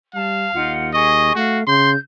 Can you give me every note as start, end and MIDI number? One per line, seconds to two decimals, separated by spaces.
0.15 0.48 55
0.15 0.73 77
0.15 0.50 81
0.54 1.34 39
0.54 0.90 63
0.54 0.90 65
0.54 0.90 78
0.93 1.35 68
0.93 1.32 75
0.93 1.35 85
1.35 1.65 57
1.35 1.60 66
1.35 1.60 77
1.67 1.95 49
1.67 1.91 84
1.67 1.97 91